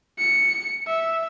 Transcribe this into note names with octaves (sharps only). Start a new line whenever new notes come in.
C#7
E5